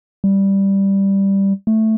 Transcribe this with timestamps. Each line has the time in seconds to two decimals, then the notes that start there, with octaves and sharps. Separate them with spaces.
0.24 G3
1.67 A3